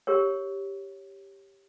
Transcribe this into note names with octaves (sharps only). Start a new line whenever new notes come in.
G4 A#4 C#5